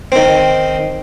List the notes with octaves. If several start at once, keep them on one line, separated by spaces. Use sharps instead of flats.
D#3 C4